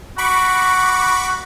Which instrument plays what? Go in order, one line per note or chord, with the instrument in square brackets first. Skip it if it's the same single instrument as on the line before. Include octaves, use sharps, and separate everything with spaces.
[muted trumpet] F#4 [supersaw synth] B5 C#6 D6